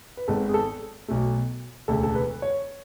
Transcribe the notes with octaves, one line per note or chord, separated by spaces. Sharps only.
B4
G#1 G#2 G#3 B3 A4
G#4
A4
B1 B2 A3
E1 D2 C#3 A4
A4
B4
C#5